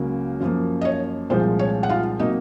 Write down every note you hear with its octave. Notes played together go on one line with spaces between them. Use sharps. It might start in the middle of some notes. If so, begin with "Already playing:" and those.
Already playing: C#2 C#3 F#3 A#3
F#2 F3 A#3
D#5
C#5
C2 A#2 F3 G#3 C5
C#5
F#5
F4 F5
C3 F#3 A#3 D#4 D#5